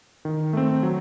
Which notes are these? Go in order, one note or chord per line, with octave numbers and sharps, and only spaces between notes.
D#3
A3 C4
F#3